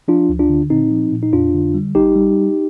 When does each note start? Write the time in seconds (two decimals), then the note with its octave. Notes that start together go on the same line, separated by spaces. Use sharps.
0.08 F3 D4 F4
0.29 D2
0.39 D4 F4
0.49 D3
0.70 A#2 C4 D#4
0.91 F3
1.12 A#2
1.23 D#4
1.33 F2 D4 F4
1.54 D3
1.74 G3
1.95 G#1 D#4 G4
2.15 G3